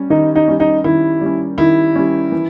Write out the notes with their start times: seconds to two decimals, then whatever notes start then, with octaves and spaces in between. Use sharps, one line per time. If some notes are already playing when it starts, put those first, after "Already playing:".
Already playing: G3 C#4
0.10 D#3 D#4
0.35 D#4
0.48 G3 C#4
0.60 D#4
0.84 D#3 E4
1.21 G3 C#4
1.58 D#3 E4
1.96 G3 C#4
2.32 E3